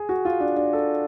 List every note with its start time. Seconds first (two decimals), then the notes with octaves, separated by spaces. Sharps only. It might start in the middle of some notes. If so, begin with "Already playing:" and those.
Already playing: G#4
0.09 F#4
0.25 F4
0.40 D4
0.56 D4
0.73 A4